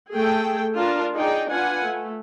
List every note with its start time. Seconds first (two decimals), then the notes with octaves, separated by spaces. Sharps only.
0.13 A3 G#4 A4 G5
0.76 D4 F4 A#4 A5
1.14 D#4 G#4 D5 G5
1.50 D4 F4 B4 F#5 G#5
1.84 A3